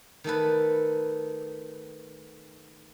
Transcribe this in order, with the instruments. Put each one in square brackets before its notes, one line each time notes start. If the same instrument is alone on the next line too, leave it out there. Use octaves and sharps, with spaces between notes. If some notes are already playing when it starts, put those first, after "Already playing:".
[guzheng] D#3 A3 A4 B4